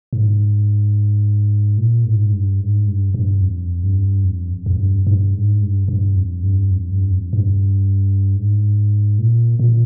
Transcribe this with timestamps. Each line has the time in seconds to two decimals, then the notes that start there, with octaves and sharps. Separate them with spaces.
0.13 G#2
1.77 A#2
2.05 G#2
2.32 G2
2.60 G#2
2.87 G2
3.14 G2
3.42 F2
3.83 G2
4.24 F2
4.66 F2
4.79 G2
5.07 G2
5.34 G#2
5.62 G2
5.88 G2
6.16 F2
6.43 G2
6.71 F2
6.92 G2
7.12 F2
7.33 G2
8.36 G#2
9.18 A#2
9.59 A#2